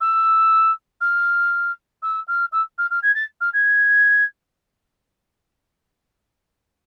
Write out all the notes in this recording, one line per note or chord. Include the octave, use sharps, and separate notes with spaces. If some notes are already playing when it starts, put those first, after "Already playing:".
E6
F6
E6
F6
E6
F6
F6
G#6
A6
F6
G#6